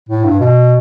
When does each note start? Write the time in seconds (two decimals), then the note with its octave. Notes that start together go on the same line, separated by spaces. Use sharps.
0.09 A2
0.24 G2
0.40 B2